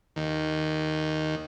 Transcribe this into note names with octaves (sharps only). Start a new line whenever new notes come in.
D#2